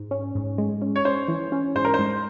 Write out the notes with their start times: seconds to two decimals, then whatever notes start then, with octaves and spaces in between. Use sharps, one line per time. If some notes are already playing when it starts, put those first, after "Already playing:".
Already playing: G#2
0.11 C#4
0.35 G#2
0.58 G#3
0.82 C#4
0.96 C#5
1.05 C#4 C5
1.28 E3
1.52 C#4
1.75 G#2 C5
1.85 A#4
1.94 C5
1.99 G#2